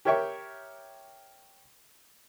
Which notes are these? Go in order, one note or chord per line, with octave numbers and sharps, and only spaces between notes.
G4 A#4 C#5 E5 G5 C#6